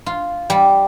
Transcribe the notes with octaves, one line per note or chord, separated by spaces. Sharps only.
F4
G3